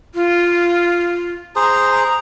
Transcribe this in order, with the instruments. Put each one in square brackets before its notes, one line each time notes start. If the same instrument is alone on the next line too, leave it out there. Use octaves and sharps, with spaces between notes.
[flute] F4
[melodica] G#4 C5 [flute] A#5
[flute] A#5